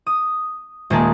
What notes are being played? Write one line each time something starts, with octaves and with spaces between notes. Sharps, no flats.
D#6
D#1 G#3 A#3 G#4 A5